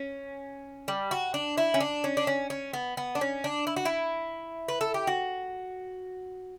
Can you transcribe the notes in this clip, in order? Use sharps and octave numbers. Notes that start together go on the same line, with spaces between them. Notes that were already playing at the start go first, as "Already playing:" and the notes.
Already playing: C#4
G3
F#4
D4
E4
C#4
D4
C#4
D4
C#4
C#4
B3
B3
D4
C#4
D4
E4
F#4
E4
B4
A4
G4
F#4